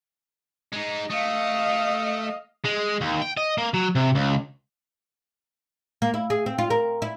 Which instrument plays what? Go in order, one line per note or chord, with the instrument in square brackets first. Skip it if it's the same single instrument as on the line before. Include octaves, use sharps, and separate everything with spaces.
[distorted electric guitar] G#3 D#4
[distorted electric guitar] A3 [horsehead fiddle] D#5 F5
[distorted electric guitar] G#3
D#2
G5
D#5
A#3
F#3
C3
C#2
[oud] A#3
E4
G#4
C4
F4
A#4
E4